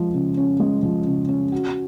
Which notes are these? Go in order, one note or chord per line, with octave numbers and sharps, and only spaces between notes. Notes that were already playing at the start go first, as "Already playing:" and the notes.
Already playing: F3 G#3
C#3
C#4
G#3
F3
C#3
C#4
F#4